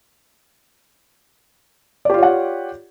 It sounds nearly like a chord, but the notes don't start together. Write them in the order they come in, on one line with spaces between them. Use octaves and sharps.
D5 G4 F4 C#5 F#5